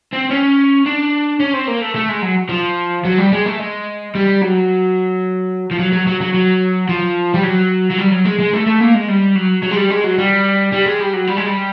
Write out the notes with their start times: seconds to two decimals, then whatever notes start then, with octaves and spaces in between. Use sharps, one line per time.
0.13 C4
0.30 C#4
0.86 D4
1.40 C#4
1.53 C4
1.68 A#3
1.82 A3
1.96 A3
2.09 G#3
2.22 F#3
2.49 F3
3.05 F#3
3.18 G3
3.32 G#3
3.46 A3
3.59 G#3
4.15 G3
4.41 F#3
5.71 F3
5.79 F#3
5.92 F#3
6.07 F#3
6.21 F#3
6.34 F#3
6.89 F3
7.34 G3
7.43 F#3
7.91 F#3
7.98 G3
8.12 F#3
8.25 G#3
8.39 G#3
8.53 A3
8.67 A3
8.80 A#3
8.94 G#3
9.08 G3
9.36 F#3
9.63 F#3
9.71 G#3
9.77 G3
9.90 G#3
10.04 F#3
10.18 G3
10.72 G3
10.86 G#3
11.00 G3
11.13 F#3
11.27 G3
11.37 G#3
11.46 G3